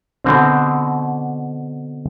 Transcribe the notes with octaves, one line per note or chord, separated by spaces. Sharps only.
B2 D3 C4